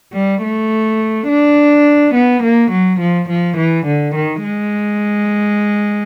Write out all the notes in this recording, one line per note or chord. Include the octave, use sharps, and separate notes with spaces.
G3
A3
D4
B3
A#3
F#3
F3
F3
E3
D3
D#3
G#3